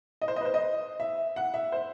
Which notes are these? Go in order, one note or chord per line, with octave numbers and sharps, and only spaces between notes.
D#5
C5
D#5
B4
C5
D#5
E5
F#5
E5
C5